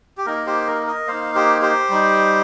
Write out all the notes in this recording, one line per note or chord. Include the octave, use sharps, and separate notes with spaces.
G4
A#3 D#4 A#4
G4 C5
A#4
A#4 D#5
A#3 D#4 C5 F5
G4 C5
G4 C5
G3 D#4